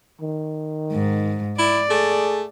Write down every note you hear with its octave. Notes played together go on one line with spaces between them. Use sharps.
D#3
G#2
E4 D5
A3 G#4